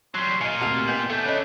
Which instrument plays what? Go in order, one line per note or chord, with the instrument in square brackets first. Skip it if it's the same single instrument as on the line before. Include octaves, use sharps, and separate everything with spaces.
[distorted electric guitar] F#3 G3 [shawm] C6 [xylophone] F#6 B6
[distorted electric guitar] A#2 F4 [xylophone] D#5 G#5 [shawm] F5 [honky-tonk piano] C#7 D#7
[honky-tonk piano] D2 C3 F#4 [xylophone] A5 F7
[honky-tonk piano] B3 G#5 F#7 [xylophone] D#5 [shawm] G5
[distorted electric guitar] A3 D4 [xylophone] A4
[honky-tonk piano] C#4 [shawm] B4 [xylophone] D#5 A5